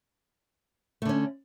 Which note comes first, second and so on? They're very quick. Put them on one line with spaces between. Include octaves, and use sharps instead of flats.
A3 D3 C#4